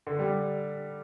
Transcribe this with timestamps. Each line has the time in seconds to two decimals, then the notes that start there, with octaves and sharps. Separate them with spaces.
0.07 D3
0.19 G3